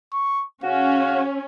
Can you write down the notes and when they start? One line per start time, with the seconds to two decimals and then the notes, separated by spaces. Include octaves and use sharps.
0.13 C#6
0.64 C#3 C#4 F#4 F5